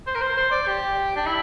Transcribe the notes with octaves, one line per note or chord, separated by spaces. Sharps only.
C5
A#4
C5
C5
D5
G4
D4
E4